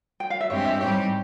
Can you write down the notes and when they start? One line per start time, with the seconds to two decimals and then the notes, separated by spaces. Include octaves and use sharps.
0.20 G5
0.30 F5
0.41 E5
0.49 G2 E3 G#3 C4 G4 C#5
0.65 E5
0.80 G#2 G3 C4 G4 C#5